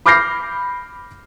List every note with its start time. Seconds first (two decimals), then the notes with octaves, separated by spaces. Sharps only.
0.06 B5 D6 F6 G6 A#6 C7